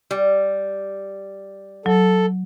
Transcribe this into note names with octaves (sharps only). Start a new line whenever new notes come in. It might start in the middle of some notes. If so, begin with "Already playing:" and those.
G3
F#3 A4